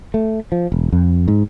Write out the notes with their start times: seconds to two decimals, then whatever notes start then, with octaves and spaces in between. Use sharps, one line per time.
0.14 A3
0.52 F3
0.72 E1
0.92 F2
1.28 G#2